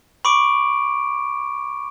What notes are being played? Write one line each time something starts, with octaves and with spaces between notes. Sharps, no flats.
B5 C#6 D6 D7